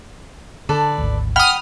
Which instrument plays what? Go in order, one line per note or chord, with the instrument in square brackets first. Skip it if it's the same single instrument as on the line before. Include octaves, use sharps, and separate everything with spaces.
[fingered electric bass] D3 [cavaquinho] A4 B4 D5
[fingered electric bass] G#1 D2
[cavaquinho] F#5 G5 B5 [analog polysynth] D#6 F6